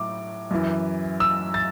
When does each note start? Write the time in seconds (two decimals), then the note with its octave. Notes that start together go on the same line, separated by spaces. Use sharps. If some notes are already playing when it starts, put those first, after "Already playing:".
Already playing: A2 F#3 D6
0.51 F#2 E3
1.20 E6
1.54 A6